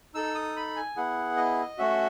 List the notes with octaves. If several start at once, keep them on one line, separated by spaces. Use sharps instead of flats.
D#4 A4 E6
D#6
B5
G#5
B3 E4 G#4 F#5
D#5
A3 C#4 F#4 E5